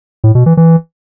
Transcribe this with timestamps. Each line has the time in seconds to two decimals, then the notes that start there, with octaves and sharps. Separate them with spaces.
0.24 A2
0.35 B2
0.46 E3
0.57 E3